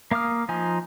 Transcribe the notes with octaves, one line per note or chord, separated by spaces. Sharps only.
A#3 F5 D6 D#6 F6
F3 D#4 G#5